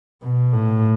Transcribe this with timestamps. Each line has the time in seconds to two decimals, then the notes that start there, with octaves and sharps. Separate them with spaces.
0.23 B2
0.53 A2